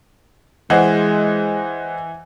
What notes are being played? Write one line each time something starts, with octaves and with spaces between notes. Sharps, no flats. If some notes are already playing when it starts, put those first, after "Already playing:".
E3 G#3 C5 D#5 F#5